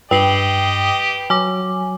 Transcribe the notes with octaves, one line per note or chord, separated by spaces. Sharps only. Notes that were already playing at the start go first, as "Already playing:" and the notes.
G2 G4 B4 D#5 G5 C7 F#7
F#3 G#5 D6